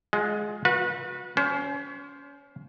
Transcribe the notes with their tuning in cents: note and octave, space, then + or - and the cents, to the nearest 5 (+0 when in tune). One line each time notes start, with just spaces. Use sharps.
G#3 +15 F4 +45 G#4 +0
F#4 -35 B4 -20
C#4 +30 C5 +0